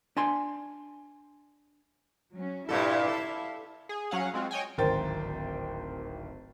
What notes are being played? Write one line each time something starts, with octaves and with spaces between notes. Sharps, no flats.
D4 G#5 C6
F#3 C#4
G2 A#2 E4 A4 E5 F5
A4
G#4
F#3 C#4 F5 F#5
G#3 C4 F4 F#4
C#5 D#5 G5 G#5
D1 G#1 A#4 C5 G5 A6